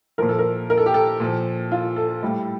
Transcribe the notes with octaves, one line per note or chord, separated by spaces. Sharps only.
A#2 F3 A#4
A4
A#4
A#4
A4
G4
A4
A#2 F3
F4
A4
A2 G3